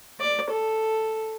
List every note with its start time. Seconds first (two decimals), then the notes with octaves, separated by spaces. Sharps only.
0.20 D5
0.50 A4